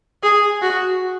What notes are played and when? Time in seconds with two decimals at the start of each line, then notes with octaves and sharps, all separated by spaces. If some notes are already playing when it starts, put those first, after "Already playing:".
0.23 G#4
0.61 F#4